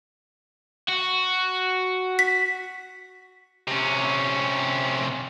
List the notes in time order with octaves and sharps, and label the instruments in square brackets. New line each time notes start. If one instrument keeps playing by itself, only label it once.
[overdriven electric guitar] F#4
[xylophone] B6
[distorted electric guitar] C3 C#4